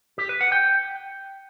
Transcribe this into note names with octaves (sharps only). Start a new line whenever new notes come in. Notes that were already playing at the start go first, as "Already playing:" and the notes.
G4
B4
F#5
G5